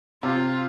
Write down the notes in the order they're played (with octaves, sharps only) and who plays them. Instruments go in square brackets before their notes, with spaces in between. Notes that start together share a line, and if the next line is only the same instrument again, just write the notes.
[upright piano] C3 [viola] F4